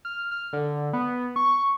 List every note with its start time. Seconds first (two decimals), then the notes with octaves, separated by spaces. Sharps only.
0.05 F6
0.31 F6
0.53 D3
0.93 B3
1.36 C#6